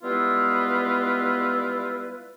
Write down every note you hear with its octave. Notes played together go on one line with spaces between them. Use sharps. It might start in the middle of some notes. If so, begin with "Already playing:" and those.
G3 G#3 B3 E4 F4 B4